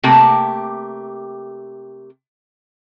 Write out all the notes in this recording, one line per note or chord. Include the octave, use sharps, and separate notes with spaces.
C3 A3 A#3 G4